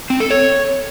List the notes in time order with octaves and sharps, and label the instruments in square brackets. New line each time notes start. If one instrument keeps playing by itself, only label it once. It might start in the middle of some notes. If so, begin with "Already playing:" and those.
[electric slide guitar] C4
A4
C#5